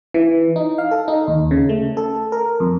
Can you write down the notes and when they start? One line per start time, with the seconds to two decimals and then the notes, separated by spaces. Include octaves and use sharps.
0.14 E3
0.56 D#4
0.78 F5
0.91 A4
1.08 D#4
1.28 D#2
1.51 C#3
1.69 A3
1.97 A4
2.32 A#4
2.60 F2